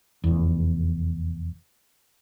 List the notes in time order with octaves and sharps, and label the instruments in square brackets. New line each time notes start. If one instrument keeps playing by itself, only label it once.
[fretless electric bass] F1 E2